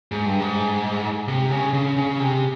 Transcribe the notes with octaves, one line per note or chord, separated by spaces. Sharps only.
G#2
G2
G#2
C3
C#3
C#3
C#3
C3